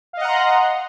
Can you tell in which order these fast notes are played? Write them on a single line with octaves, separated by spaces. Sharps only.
F5 D#5 F#5 A#5 C6